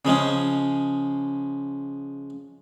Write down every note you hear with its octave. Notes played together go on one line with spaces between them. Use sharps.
C#3 F3 G#3 C#4